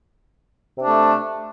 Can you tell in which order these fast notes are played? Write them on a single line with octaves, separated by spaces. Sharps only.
C3 D4 A3